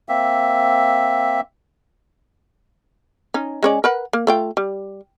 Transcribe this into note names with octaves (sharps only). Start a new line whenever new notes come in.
A#3 C4 E5
C#4 D#4
G#3 C#4 D5
A#4 B4 F#5
A#3
A3 F4 G5
G3